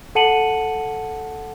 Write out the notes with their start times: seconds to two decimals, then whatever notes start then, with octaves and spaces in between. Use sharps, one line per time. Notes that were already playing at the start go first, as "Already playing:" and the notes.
0.15 A4 F#5 A5 C#7 D#7 F#7